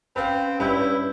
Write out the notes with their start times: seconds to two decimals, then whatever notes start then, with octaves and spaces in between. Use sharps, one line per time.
0.16 C4 C#4 B4 F5 G5 C6
0.60 G2 C#4 E4 B4 C#5 G6